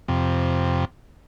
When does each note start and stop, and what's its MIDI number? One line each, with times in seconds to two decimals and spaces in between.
0.08 0.85 41
0.08 0.85 48